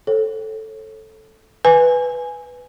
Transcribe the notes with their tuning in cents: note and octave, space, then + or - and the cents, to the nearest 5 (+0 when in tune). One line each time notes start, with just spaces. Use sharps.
A4 +0 C#5 -45
B4 +0 G#5 +0